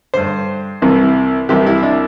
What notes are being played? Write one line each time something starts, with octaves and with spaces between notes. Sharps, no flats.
G2 D3 C5
C2 C3 E3
C2 C3 E3 G4
E4
D4